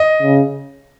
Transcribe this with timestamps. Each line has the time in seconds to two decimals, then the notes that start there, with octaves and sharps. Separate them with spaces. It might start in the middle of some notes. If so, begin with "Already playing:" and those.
Already playing: D#5
0.22 C#3